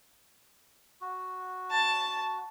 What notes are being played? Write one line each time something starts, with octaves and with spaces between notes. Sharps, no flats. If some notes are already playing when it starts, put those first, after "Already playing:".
F#4
A5